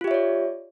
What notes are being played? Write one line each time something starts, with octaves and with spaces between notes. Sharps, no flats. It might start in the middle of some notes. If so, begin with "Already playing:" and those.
F4 G4 C#5 D5 E5